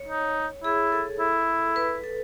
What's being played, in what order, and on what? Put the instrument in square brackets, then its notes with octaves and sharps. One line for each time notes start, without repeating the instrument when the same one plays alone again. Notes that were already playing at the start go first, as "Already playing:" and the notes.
Already playing: [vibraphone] C#5
[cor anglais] D#4
[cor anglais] E4 [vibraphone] G#4
[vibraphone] A4
[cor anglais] E4
[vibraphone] B4
A4